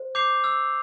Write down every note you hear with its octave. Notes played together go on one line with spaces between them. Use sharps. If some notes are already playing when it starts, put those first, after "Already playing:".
Already playing: C5
D6 G6 C7 F7
E6